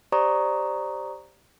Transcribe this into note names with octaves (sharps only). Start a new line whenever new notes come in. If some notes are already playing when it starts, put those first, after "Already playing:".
G4 C5 D5 A#5 C#6 D#6